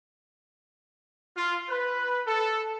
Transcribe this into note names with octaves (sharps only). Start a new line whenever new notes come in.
F4
B4
A4